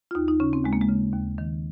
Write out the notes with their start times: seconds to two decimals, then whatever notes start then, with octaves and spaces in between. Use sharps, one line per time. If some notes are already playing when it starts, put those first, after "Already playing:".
0.11 F4
0.15 D#2 D#4
0.28 D#4
0.40 C#3 C#4
0.53 C4
0.65 D#2 G#3
0.73 A#3
0.81 G#3
0.89 C#3
1.14 D#2
1.38 D#3